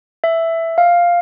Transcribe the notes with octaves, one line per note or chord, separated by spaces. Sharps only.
E5
F5